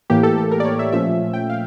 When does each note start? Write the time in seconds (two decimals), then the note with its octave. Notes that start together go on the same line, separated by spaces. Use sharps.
0.10 A2 E3 A#3 G4
0.23 A4
0.38 A4
0.51 A#4
0.60 D5
0.65 C#5
0.79 E5
0.92 A#2 F3 A3 C#4 E5
1.33 G5
1.50 F5